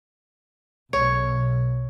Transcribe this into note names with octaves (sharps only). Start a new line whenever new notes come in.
B1 C#5